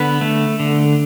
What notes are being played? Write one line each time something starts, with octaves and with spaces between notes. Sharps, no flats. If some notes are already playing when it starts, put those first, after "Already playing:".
Already playing: D3 B3 B4
A3
D3